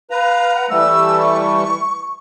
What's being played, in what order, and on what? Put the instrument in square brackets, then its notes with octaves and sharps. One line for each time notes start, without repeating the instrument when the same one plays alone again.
[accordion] B4 A#5 [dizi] F5
[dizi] F#5
[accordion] E3 G3 A3 [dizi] E6
[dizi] C#6